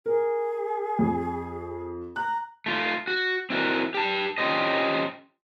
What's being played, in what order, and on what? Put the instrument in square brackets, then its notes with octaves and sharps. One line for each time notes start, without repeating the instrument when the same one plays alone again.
[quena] G#4 [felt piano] A#4
[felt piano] F2
[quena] A#5 [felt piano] F#6
[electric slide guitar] A3 F4
F#4
C4 E4 F#4 A#4
G4 A5
C#4 F4 G4 C5 D#5